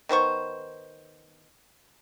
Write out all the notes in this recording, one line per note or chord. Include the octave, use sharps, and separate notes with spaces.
D#3 B3 C5 C#6